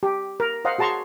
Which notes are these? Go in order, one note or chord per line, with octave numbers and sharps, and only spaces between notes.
G4
A#4
C5 D#5 F5 F#5 A#5
F#4 G#4 A5 A#5 C6 C#6